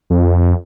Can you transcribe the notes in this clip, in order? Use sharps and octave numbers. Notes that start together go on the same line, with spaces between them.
F2